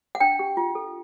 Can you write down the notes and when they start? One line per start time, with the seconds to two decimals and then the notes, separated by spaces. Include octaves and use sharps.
0.15 F#5
0.20 D4 G5
0.39 G4
0.57 F4
0.75 A4